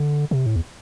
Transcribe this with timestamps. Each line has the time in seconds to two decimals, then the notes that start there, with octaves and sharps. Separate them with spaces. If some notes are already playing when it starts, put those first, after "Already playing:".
Already playing: D3
0.31 C3
0.46 A2
0.56 E2